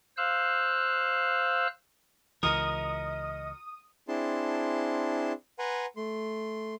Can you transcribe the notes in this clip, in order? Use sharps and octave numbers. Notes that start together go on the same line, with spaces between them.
C5 F5 E6 F#6
C#2 E3 F#4 A#4 D#5 D#6
C4 D4 E4 G#4 A5 C6
B4 F#5 G#5 A#5 C6
A3 C6